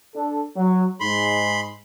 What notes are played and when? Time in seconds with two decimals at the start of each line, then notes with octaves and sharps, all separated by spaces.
0.15 D4 A4
0.56 F#3
1.00 G#2 G#3 B5 C6